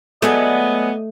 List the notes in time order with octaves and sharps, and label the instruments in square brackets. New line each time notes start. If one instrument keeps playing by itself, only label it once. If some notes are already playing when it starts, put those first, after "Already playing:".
[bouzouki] F#3 G#3 D5 [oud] A3 [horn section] B3 [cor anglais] D#5